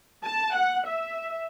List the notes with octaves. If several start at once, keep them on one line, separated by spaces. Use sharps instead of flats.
A5
F#5
E5